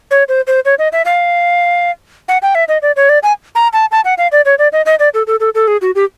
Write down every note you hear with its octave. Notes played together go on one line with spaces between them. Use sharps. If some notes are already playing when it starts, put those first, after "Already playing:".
C#5
C5
C5
C#5
D#5
E5
F5
F#5
G5
E5
D#5
D5
C#5
D5
G#5
A#5
A5
A5
F#5
F5
D5
C#5
D5
D#5
D#5
D5
A4
A4
A4
A4
G#4
F#4
G4